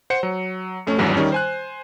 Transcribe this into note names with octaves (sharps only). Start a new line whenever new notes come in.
C5 F#5 C#7
F#3
F2 A3 C#4
G#1 E2 G2 E3 F#3 G3
D#3 G3 C#4
C5 G#5 F#6